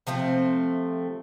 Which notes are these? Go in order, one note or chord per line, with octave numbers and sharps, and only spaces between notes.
C3 F3 A3 C4